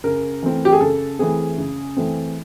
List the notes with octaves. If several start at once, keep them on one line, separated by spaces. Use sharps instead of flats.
C#3 A#4
E3 A3 C4
G4
G#4
C#3 A4
E3 A3 C4 G#4
C#3
E3 A3 C4